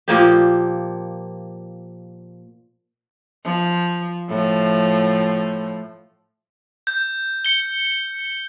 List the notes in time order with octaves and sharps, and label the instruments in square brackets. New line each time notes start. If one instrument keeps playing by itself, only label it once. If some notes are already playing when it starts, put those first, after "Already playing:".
[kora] A#2 F3 A#3 G4
[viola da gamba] F3
A2 F3
[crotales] G6
C#7 G7